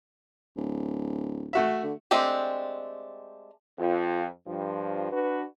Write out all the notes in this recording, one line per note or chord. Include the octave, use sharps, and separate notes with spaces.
D1
A3 F#4 E5
D3
G#3 A3 C4 D4 G4
F2 F4
G2 F3
D4 F#4 B4